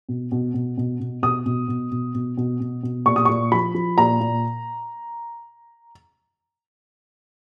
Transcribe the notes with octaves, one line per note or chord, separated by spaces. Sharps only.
B2
B2
B2
B2
B2
B2 D#6
B2
B2
B2
B2
B2
B2
B2
A#2 C#6
D#6
A#2 C#6
F3 B5
F3
A#2 A#5
A#2